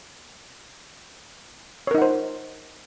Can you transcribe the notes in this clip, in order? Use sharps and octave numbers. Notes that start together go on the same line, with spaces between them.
D#4 A#4 C5 C#5 F#5